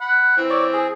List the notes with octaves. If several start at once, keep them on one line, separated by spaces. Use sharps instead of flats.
F#5 B5
E3 C4
C#5 D5
G#4